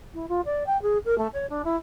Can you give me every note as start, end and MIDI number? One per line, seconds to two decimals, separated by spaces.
0.14 0.25 64
0.28 0.41 65
0.45 0.63 74
0.66 0.80 79
0.82 0.97 68
1.05 1.17 70
1.18 1.27 57
1.33 1.46 73
1.49 1.62 62
1.64 1.76 64